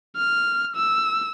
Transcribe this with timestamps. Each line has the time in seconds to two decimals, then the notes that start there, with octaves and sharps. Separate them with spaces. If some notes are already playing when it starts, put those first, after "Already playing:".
0.17 F6
0.76 E6